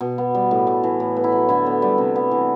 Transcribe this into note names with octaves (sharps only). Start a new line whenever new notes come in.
B2
B3
G3
A2
A3
E3
A2
B3
E4
F#3
D3 E4
B3
G3
C3
B3
E3